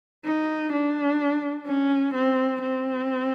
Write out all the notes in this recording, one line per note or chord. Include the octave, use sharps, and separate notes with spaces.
D#4
D4
C#4
C4
C4